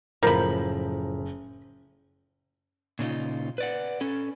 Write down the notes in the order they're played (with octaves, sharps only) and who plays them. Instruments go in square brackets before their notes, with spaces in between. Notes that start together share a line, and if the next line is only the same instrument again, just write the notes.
[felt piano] F#1 G6 [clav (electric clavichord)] A2 F3 [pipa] A#4 B5
[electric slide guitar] A#2 C#3 D#4 F4
B4 D5 F#5
C#4 A4